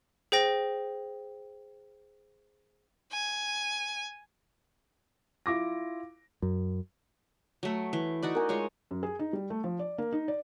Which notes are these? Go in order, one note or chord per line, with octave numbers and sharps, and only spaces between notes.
G#4 C5 G5 A#6
G#5
E4 F4 D6 A#6
F#2
F#3 A3
E3
D#4 F#4 D5
A#4 G#5
G#3 F4 C#5
F#2
G#4
D#4
G3
A3
F3
D5
A#3
D#4
D5